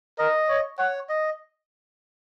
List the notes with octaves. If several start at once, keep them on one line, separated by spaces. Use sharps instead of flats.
A#4 D#5
C#5
C#5 F#5
D#5